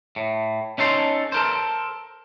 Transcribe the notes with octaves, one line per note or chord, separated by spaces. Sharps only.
A2
C#4 D#4 A4 C6
A4 A#4 C5